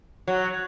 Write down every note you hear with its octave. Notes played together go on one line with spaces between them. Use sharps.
F#3